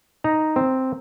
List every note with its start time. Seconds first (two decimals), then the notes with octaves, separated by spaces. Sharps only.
0.24 D#4 A#5
0.56 C4